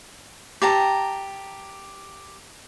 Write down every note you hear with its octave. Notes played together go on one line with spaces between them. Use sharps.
G4 A5 A#5